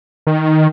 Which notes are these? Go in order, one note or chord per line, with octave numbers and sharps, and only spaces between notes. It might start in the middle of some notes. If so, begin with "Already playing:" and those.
D#3